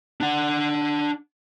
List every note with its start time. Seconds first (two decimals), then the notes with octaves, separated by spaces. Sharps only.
0.20 D4 F#5